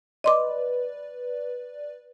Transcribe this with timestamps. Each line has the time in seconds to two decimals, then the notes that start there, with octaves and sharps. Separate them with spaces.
0.24 B4 D5 D#5 C6 D6